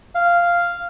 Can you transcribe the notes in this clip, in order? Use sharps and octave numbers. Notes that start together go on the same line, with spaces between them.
F5